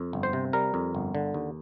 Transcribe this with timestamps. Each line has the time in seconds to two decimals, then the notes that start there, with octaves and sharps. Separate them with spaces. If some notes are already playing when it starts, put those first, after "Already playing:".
Already playing: F2
0.13 G1
0.23 C5
0.33 C3
0.53 G3 A#4
0.74 F2
0.95 G1
1.15 D3
1.34 D#2